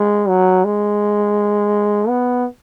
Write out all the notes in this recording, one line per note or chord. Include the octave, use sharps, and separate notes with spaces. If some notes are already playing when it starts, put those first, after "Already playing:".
Already playing: G#3
F#3
G#3
B3